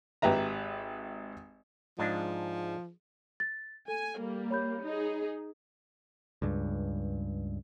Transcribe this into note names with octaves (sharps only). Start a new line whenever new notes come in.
G#1 G4 B4 E5 A#5
G#2 F3 G#3 D4
A6
A4 G#5
G3 A#3
C#5 B5 G6
D#4 G#4
C#2 G2